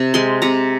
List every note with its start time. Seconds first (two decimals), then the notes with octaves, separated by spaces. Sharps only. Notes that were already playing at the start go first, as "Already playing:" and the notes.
Already playing: C3
0.14 G#3 C6
0.42 C3 A#5